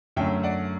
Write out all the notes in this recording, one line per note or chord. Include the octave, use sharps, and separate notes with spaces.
F#2 D3 A3 C#4 E5 G5
D5 F#5